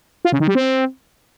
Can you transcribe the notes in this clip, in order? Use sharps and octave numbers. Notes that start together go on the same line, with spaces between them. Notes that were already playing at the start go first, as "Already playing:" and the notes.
F4
C#3
D#3
G3
C4